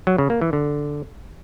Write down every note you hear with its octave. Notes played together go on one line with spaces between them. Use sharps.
F#3
C#3
A#3
E3
D3